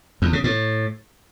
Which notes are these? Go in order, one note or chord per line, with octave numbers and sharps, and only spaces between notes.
E2
C#3
A2